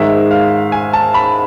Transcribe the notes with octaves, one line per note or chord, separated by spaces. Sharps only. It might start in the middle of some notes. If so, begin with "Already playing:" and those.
Already playing: G#2 D#3 G#3 E5
F5
G#5
A5
B5